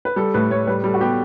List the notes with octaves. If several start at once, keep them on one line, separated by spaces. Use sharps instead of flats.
B4
G3 A4
A2 B4
A2 C#5
G3 B4
G3 A4
F#4
B3 G4